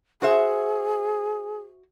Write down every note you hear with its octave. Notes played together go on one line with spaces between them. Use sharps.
F#4 G#4 C5 E5